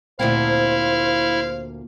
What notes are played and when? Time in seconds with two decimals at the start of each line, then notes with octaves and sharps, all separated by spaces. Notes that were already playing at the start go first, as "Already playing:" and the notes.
0.19 D2 A#2 C4 E4 C5 F5